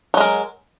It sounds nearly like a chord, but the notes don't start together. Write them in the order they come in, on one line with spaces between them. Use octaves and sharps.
F#3 G#3 A#4